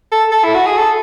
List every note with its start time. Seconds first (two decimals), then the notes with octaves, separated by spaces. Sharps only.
0.12 A4
0.32 A4
0.44 E4
0.55 F#4
0.67 G#4
0.78 A4